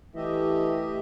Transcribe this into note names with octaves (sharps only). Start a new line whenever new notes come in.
E3 A3 G4 D#5 E5